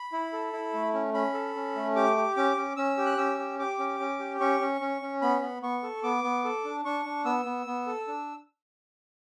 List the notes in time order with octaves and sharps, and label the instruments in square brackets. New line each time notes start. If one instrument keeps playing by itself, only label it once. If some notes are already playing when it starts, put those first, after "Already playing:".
Already playing: [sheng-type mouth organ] B5
E4
A4
E4
A3
C#4
C#4 B5
A4
C#4
A3
G4 D6
G4
C#4 D6
C#4
C#4 E6
G4
F#6
C#4 E6
G4
G4 D6
C#4
C#4
G4
C#4 C#6
C#4
C#4
C#4
B3 B5
B3
B3 C#6
A4
B3 D6
B3
A4
D4
D4 C#6
D4
B3 E6
B3
B3
A4
D4